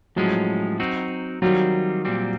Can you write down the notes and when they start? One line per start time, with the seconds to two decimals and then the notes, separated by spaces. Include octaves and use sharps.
0.16 A2 F3 F#3 G#3 C#4
0.80 C4 D#4 F#4
1.42 D#3 F#3 G3 C4 F4
2.05 A#2 G3 C4